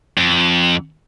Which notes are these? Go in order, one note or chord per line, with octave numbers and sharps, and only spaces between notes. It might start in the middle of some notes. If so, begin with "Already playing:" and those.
F2